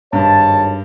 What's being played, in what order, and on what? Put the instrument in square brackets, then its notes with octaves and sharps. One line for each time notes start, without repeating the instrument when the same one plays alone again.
[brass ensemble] G#1 C#5 A5 [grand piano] G2